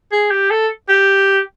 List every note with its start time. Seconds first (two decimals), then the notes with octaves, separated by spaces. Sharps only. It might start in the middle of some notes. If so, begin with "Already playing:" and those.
0.12 G#4
0.31 G4
0.51 A4
0.89 G4